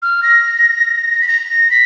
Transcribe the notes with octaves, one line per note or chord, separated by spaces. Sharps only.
F6
A#6
B6
A#6
B6